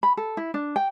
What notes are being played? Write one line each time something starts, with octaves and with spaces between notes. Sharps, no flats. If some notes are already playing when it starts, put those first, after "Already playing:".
B5
A4
E4
D4
G5